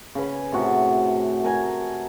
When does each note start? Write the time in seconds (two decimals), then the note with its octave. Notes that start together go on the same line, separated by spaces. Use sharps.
0.15 C#3 B4
0.52 A2 C3 F#4
1.43 A4 A#4 G#5